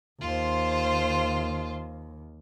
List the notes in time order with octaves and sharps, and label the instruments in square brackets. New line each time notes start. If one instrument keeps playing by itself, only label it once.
[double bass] D#2 [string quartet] F4 C5